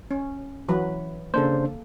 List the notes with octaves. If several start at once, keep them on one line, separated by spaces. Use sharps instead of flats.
C#4
E3 F#3 B4
C#3 A#3 D4 A4 C5